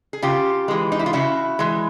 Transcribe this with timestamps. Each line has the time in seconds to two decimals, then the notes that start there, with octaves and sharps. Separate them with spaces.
0.13 G#4
0.22 C#3 F4 G4
0.68 E3 G#3
0.92 D#4
0.99 E4
1.06 F4
1.13 C#3 E4 F#4
1.59 E3 G#3